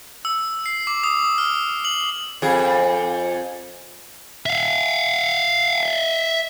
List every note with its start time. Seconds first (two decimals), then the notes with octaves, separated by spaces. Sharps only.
0.25 E6
0.66 C7
0.87 D6
1.03 D#6
1.38 F6
1.85 F#7
2.42 F2 G#4
4.46 E5 F5